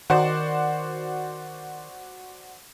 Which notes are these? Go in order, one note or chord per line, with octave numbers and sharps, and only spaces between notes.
D#3 F#4 C5 D5